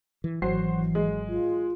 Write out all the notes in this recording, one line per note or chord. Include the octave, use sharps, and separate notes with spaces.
E3
G#1 E3 F#3 F#4 C5 C7
G#3
F4